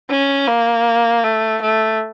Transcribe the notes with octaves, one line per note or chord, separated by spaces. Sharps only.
C#4
A#3
A3
A3